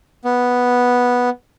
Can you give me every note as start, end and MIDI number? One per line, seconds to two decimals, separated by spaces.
0.25 1.30 59